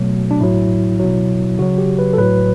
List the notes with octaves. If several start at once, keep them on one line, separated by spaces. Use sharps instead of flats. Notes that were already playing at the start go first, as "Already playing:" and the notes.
Already playing: B2 F#3 A3
D4
A2 F#3 E4
B2 F#3
C#3 F#3 F#4
G4
B4
A4
A2 F#3 B4